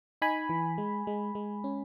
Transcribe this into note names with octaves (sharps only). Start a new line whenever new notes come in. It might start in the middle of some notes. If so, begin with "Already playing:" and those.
D#4 G#5 B5
E3
G#3
G#3
G#3
C#4